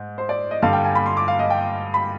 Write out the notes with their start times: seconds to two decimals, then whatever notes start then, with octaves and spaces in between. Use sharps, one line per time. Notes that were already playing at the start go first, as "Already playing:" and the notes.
Already playing: G#2
0.18 C5
0.29 D5
0.51 D#5
0.62 G2 D3 G3 F5
0.73 G5
0.84 G#5
0.95 B5
1.06 C6
1.17 D6
1.28 F5
1.39 D#5
1.50 G5
1.94 B5